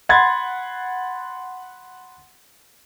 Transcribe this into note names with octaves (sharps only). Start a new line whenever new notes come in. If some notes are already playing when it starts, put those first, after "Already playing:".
F#5 B5 C6 G#6 A6